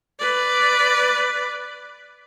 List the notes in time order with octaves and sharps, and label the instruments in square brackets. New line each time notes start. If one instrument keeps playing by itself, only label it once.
[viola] B4 D5